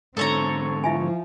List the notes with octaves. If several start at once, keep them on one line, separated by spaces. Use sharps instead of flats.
G#2 D3 C4 A4 C#5 A#5
F3 E4 E5 G#5